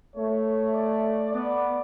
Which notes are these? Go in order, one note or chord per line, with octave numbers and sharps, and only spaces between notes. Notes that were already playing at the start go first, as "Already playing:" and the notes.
A3 C#5
D5
B3 D5